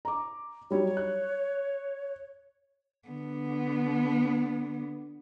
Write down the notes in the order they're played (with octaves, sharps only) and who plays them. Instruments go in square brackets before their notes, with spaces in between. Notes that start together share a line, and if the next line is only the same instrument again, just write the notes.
[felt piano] A#5 D6
[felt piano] F#3 G3 D#4 [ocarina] C#5
[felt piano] F#6
[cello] D3 B3